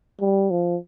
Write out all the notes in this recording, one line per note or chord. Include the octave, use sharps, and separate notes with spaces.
G3
F3